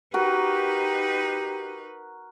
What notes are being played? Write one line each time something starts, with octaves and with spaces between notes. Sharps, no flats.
D#4 F#4 G4 A#4 B4